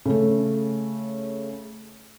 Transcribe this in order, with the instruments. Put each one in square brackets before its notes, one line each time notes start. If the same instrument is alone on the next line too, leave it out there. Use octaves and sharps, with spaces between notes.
[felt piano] C#3 A3